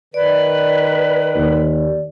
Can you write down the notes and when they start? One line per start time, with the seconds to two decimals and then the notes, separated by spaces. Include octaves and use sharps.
0.14 D#3 B4 D5
1.36 D#2